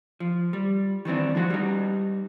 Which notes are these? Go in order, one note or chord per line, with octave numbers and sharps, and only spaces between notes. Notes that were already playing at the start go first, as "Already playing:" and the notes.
F3
G3
D#3 E3 C4 D4
F3 G#3 F#4
G3 D#4